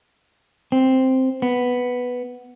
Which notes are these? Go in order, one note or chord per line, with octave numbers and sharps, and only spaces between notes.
C4
B3